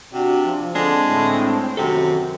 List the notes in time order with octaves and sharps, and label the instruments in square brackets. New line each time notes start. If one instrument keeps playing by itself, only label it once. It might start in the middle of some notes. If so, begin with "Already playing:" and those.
[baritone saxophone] C3 [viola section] D4 [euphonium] F#4
[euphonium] F3
[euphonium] D3 [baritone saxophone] G#3 [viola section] C4 [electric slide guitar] D4
[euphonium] A2
[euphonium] F#2 [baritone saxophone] C3 [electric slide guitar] D#3 F#4 A4